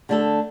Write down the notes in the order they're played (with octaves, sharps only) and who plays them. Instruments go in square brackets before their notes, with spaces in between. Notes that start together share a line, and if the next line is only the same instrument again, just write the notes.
[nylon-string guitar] D3 A3 D4 A4